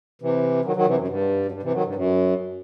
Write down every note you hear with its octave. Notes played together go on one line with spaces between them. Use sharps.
C3 E3
D#3 F#3
D#3 F#3
C3 E3
F#2
G2
F#2
G2
C3 E3
D#3 F#3
G2
F#2